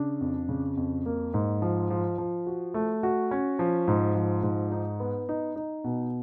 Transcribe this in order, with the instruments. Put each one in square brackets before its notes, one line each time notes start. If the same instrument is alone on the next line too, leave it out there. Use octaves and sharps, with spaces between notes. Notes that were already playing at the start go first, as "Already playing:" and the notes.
Already playing: [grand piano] C#3 D4
F2
C#3
F2
A#3
G#2
F3
F3
F3
F#4
A3
F#4
C#4
F3
G#2
F3
G#2
D#4
B3
D#4
D#4
B2